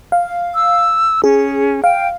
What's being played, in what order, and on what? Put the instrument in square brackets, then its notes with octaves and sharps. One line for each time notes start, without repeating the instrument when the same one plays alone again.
[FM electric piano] F5
[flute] E6
[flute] C#4 [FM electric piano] G#4
[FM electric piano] F5 [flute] G5